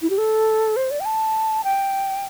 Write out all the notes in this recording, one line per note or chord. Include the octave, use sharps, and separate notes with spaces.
E4
G4
A4
C5
D5
G5
A5
G5